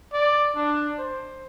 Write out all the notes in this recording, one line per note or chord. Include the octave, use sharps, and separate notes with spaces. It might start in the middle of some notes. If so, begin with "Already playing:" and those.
D5
D4
C5